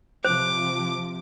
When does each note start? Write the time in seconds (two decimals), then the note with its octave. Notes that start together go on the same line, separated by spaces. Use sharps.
0.25 C3 F3 C5 D6